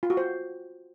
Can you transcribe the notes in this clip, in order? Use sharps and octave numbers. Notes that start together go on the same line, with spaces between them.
F4
F#4
C5